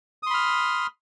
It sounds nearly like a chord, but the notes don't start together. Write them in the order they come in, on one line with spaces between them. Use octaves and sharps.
D#6 C6 B5 F6